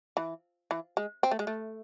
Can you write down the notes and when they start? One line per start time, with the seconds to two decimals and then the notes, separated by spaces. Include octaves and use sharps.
0.17 E3
0.71 E3
0.97 G#3
1.23 C4
1.31 A3
1.39 G#3
1.47 A3